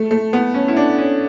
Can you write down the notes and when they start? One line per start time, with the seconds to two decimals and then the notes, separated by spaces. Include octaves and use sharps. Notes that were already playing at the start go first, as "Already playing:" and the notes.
Already playing: A3
0.11 A3
0.33 B3
0.54 C#4
0.68 E4
0.76 D4
0.98 C#4